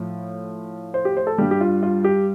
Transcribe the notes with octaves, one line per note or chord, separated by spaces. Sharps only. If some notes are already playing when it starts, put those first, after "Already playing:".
Already playing: A2 F3
C5
G4
C5
A4
G2 G3 G4
G4
F4
F4
G4